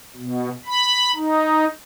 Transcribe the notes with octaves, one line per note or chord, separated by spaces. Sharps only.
B2
B5
D#4